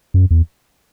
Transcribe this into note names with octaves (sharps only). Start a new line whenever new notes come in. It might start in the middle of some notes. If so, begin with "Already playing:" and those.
F#2
E2